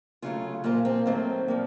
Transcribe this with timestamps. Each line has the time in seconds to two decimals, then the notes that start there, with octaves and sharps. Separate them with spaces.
0.22 C#3 F#3 A3 F4
0.64 A#2 F3 A#3 F4
0.85 C4
1.06 D#3 F#3 A3 C4
1.48 A#2 F3 A#3